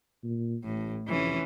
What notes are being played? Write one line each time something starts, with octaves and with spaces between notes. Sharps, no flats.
A#2
A1 A2
F1 E3 C#4